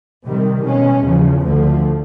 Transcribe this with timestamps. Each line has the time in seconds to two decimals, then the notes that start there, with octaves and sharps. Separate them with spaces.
0.24 C3 D#3 G3
0.63 B2 G#3 C#4
1.04 E2 C#3 F3
1.43 D2 D3 F3 A3